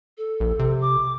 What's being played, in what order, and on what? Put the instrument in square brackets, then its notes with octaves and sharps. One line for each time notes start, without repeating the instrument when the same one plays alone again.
[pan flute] A4
[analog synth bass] A#1
C3
[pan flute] D6